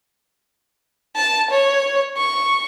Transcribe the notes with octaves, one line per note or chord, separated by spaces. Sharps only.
A5
C#5
C#6